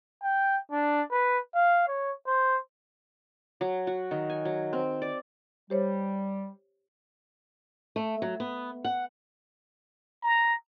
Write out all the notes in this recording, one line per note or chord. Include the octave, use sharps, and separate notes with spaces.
G5
D4
B4
F5
C#5
C5
F#3
F#4
D#3
G#5
F#3
C4
D5
G3 G4 C5 C#5
A3
F#3
B3
F#5
A#5